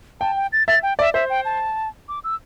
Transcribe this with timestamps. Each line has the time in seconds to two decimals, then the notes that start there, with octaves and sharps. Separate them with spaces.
0.20 G5 A5
0.36 G5
0.53 A6
0.68 E5 A6
0.83 G5
0.99 D5 E5
1.14 C5 E5
1.30 G5
1.45 A5
2.08 D6
2.24 E6